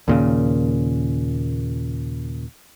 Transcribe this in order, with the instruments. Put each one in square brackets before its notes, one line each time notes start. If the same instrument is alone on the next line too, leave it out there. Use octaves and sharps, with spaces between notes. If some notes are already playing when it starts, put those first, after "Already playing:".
[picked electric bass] D#2 A#2 C#3